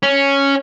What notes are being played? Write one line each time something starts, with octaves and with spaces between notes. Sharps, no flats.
C#4